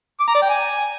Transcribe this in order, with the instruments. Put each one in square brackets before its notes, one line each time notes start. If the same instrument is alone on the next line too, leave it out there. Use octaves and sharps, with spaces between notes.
[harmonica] D6
A#5
D5
G5
G#5